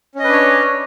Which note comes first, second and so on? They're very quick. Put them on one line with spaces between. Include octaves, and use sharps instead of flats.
C#4 D#5 B4 D4 C#5